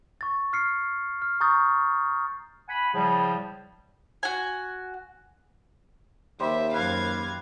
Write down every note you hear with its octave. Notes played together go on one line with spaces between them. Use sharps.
C#6 A6
F6 C7 C#7
F6
A#5 C#6 D#6 G6 A6
F#5 G#5 B5
A2 C#3 F3 G3
F#4 G#5
D#2 G3 C5 E5
F#2 B4 F5 G#6